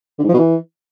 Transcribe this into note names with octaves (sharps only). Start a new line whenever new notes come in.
D3
G#2
F3
B2
E3